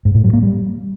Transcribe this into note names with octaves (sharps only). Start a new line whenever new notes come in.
G#2
A2
F#3
A#3
G3